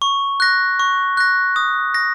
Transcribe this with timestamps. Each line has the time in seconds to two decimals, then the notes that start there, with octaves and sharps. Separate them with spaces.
0.02 C#6
0.40 F#6 A#6
0.79 C#6
1.17 F#6 A#6
1.56 D#6
1.95 A#6